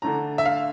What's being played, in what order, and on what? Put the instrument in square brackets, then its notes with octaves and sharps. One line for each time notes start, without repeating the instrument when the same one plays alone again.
[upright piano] D3 A3 D4 A#5
E5
F5